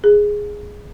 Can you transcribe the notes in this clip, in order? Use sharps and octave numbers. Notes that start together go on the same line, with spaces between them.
G#4